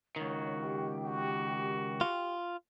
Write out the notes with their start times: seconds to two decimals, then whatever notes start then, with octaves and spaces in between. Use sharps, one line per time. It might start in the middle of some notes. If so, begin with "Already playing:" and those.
0.16 C#2 D#3 F#4 C#5
0.60 G4 G5
1.04 F#4
2.01 F4